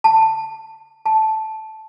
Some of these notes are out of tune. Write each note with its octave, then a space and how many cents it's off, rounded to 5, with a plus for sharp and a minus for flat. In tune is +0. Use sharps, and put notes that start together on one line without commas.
A5 +10
A5 -10